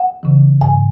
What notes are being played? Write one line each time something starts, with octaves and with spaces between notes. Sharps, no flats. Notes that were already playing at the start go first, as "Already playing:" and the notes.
Already playing: F#5
C#3 E3
G#2 G#5